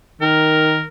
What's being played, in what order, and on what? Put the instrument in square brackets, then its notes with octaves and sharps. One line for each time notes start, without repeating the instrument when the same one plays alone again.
[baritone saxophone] D#3 [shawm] A#4